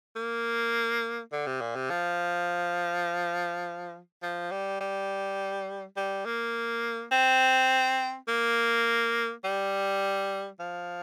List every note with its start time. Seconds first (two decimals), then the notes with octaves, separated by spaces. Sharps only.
0.16 A#3
1.32 D3
1.47 C3
1.61 A#2
1.76 C3
1.90 F3
4.22 F3
4.51 G3
4.80 G3
5.97 G3
6.25 A#3
7.12 C4
8.28 A#3
9.44 G3
10.60 F3